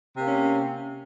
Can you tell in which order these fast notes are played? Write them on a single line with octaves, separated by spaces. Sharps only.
C3 A#3 C#4